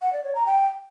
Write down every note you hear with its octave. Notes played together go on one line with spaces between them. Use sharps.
F#5
D5
C#5
A#5
G5